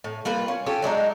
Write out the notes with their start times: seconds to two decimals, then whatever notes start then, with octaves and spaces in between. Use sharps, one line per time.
0.04 A2
0.25 G3 A#3 F4 B4
0.48 C#4
0.66 C#4 F4 G4 A4
0.82 F#3 G#3 D4 D#4